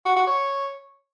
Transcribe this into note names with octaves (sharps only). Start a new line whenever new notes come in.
F#4
F#4
C#5